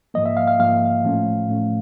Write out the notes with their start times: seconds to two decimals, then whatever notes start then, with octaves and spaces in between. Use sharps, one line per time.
0.14 G#2 F3 A#3 D#5
0.26 E5
0.37 F5
0.48 F5
0.59 G#2 F3 A#3 F5
1.04 A2 F3 A3 C#4
1.49 A2 F3 A3 C#4